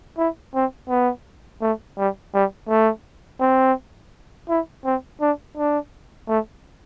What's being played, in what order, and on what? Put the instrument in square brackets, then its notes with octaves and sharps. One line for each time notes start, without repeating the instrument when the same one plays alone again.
[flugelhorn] E4
C4
B3
A3
G3
G3
A3
C4
E4
C4
D4
D4
A3